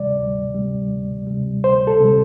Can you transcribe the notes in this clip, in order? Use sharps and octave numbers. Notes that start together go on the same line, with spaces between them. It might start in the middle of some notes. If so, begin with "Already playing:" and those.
Already playing: D2 C3 G3 D5
D2
C3 G3
D2
C3 G3
D2 C5
A4
C3 G3